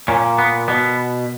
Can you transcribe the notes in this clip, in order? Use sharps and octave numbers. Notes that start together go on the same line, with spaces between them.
A#2 C#4
B3
B2 B3